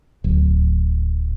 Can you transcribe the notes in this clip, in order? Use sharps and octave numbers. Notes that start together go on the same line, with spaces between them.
D1